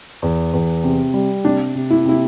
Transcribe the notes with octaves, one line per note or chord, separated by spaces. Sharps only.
E2
E2
C3
G3
C3 D4
C3
E4
C3 E4